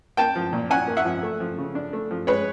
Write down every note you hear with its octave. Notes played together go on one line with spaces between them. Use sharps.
A#3 G5 A5
F3
A#2
C#4 F#5 G#5
A#3
E5 F#5
F3
A3
F3
C#3
D4
A3
F3
G#3 B4 C#5